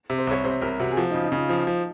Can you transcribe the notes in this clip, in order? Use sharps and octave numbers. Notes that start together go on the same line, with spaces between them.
C3
C5
C2 C#5
C3 C5
C2 A#4
C3 F#4
G#4
F3 F#4
D#4
C#3
D#4
C#3 F4
F3
F3